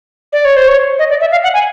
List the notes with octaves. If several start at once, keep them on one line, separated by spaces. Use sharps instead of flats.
D5
C#5
C5
C#5
D#5
D5
E5
F5
F#5
G#5